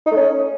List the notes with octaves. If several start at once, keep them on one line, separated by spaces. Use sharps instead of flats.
D#4
A3
C#4